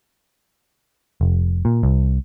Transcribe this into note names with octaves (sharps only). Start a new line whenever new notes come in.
F1
A#2
C2